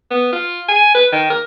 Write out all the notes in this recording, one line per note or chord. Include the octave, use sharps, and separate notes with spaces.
B3
F4
G#5
B4
D#3
A#4